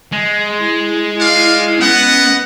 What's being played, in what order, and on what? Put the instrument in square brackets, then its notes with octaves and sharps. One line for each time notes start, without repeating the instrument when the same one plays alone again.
[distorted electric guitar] G#3
[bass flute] E4
[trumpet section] D5 F5
[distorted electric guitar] B3 [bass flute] C#4 [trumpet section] D#5 F#5